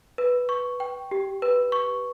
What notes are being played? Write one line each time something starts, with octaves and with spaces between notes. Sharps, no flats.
B4
C#6
G5
G4
B4
C#6